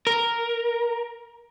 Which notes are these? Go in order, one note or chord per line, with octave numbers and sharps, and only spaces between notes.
A#4